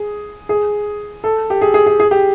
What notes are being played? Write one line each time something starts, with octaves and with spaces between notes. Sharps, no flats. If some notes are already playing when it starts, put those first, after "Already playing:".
Already playing: G#4
G#4
A4
G4
G#4
G#4
G#4
G#4
G4